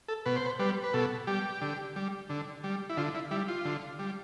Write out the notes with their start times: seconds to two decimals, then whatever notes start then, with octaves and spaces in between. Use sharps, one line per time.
0.08 A4
0.26 B2 B4
0.36 C5
0.46 B4
0.59 G3 B4
0.84 B4
0.94 B2 A4
1.27 G3 G4
1.62 D3
1.96 G3
2.30 D3
2.64 G3
2.89 E4
2.97 D3 F4
3.15 E4
3.31 G3 E4
3.48 F4
3.65 D3
3.99 G3